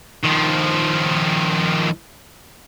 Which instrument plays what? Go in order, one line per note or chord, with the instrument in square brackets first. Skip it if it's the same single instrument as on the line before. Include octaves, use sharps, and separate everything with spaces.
[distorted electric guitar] D#3 F3